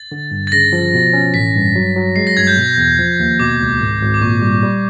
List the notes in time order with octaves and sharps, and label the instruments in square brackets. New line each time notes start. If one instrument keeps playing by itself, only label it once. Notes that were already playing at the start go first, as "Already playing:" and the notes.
Already playing: [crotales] A6
[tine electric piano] D3
G2
[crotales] A6
[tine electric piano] C#3 [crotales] A#6
[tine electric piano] F3
B2
C#4
[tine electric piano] A1 [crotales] B6
[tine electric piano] G2
F#3
F#3
[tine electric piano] G#3 [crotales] C7
[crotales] A#6
[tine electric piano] G2 [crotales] G#6
[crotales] G6
[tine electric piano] B2
E2
F3
D#2
[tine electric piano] B2 [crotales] D6
[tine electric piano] C#2
G#1
G#1
[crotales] D6
[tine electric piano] A#2 [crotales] C#6
[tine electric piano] G3
G3